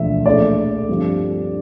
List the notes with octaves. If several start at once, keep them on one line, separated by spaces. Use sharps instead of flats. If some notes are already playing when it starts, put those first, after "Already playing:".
Already playing: E1 D2 D3 F3 A3 E5
A#1 A#2 A3 D5
G2 D3 F3 C4